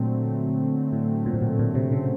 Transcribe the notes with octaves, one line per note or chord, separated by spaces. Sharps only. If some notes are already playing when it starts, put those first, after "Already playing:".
Already playing: A#2 D3 F#3 A3 C4
A2
A#2
A2
A#2
A#2
C3
C#3